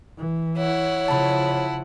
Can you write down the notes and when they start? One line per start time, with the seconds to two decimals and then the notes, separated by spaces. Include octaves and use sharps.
0.18 E3
0.57 E4 C#5 F#5
1.08 C#3 F3 A5 B5